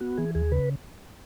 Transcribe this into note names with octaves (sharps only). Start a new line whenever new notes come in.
B3 F#4
E3 G#4
D#2 G#4
C#3 B4